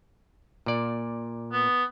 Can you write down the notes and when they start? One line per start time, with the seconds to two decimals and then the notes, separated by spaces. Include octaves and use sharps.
0.66 A#2 D5
1.53 B3